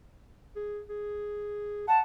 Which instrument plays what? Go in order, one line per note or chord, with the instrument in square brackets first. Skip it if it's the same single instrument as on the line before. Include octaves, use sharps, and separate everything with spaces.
[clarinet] G#4
G#4
[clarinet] F#5 [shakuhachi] A5